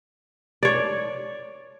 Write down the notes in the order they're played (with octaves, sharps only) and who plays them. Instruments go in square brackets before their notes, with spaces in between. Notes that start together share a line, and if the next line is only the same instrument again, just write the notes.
[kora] C#5 D5